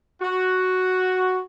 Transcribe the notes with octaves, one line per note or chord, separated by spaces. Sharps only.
F#4